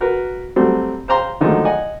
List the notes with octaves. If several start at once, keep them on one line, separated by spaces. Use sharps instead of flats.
F#4 A#4 B4
F#3 G3 A3 C4
C5 F5 A#5 C6
D3 D#3 F3 F#3 G#3 A3
D#5 F#5 G#5